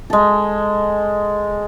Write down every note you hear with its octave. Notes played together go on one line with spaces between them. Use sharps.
G#3 A4